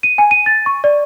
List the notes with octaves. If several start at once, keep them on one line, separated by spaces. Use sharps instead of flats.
D#7
G#5
D#7
A6
C#6
D5